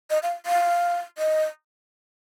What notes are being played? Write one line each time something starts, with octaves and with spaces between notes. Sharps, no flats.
D#5
F5
F5
D#5